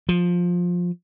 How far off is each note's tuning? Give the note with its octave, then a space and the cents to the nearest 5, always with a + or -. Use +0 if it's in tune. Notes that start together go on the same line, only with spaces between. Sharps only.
F3 +15